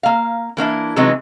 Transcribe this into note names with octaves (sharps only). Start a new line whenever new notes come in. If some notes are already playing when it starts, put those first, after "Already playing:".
A#3 F5
E3 A#3 D4 E4
C3 E3 F#3 G#3 B3 D#4